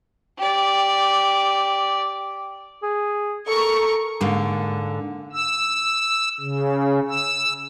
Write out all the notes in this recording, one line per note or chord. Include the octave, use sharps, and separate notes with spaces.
G4 D5
G#4
A4 A#4 C#6
G#2 D3 A#3
E6
C#3
E6